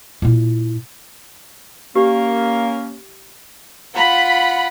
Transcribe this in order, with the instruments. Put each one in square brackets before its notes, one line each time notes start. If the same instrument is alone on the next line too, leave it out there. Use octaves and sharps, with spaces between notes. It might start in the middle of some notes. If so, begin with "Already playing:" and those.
[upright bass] A#2 E4
[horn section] A#3 C#4 [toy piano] G4
[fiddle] F4 F#5 [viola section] B5